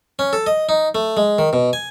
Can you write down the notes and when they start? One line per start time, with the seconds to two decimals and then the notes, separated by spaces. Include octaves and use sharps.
0.19 C#4
0.33 A4
0.47 D#5
0.69 D#4
0.95 A3
1.17 G#3
1.39 D#3
1.53 B2
1.73 G#5